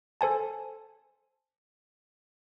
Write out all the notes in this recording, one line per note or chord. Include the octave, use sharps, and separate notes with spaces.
A4 C5 G#5 A5